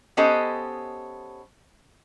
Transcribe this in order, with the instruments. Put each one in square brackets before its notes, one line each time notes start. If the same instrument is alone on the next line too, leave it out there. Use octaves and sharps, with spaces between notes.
[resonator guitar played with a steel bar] B3 C#4 G4 A4 C5 D#5